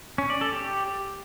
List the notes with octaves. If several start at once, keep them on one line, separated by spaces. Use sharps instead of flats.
C#4
D5
A4
G4